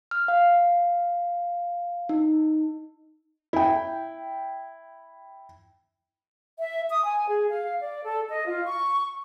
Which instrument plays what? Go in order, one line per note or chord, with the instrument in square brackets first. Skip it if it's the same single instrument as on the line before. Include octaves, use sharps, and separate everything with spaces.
[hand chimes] F6
F5
D#4
[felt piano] E4 G5
[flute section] E5
D#6
G#5
G#4
F5
D5
A4
D#5
F4
C#6